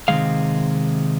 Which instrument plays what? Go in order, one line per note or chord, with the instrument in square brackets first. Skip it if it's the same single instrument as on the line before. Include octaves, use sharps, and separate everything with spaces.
[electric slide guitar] C3 D#3 G#3 F5